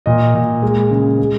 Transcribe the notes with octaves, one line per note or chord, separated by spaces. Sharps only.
A#2 D#5
A#2
G#3
C#3
G#3